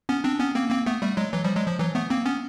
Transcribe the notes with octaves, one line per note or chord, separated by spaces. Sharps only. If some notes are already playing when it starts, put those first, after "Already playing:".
B3 C#4
C4 D4
B3 C#4
A#3 C4
A#3 C4
A3 B3
G3 A3
F#3 G#3
E3 F#3
F3 G3
F#3 G#3
F3
E3 F#3
A3 B3
A#3 C4
B3 C#4